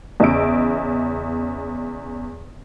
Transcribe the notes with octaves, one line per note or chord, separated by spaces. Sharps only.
E2 C#3 E4 D#5 E6 D7